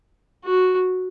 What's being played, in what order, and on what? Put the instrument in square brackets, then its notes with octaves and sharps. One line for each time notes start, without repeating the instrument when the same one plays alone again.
[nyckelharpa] F#4